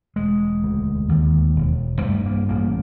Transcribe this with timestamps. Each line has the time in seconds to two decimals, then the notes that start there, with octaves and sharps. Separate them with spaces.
0.16 E1 G#3
0.63 D2
1.09 D#2
1.56 E1
2.02 G2 A3
2.26 A#3
2.49 A1 A#3